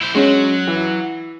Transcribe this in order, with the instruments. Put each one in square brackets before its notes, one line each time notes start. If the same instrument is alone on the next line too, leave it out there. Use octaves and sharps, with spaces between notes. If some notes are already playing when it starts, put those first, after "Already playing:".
[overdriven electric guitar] E4 C5
[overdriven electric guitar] F#3 F#4 [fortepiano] G#3 C#4
[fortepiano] E3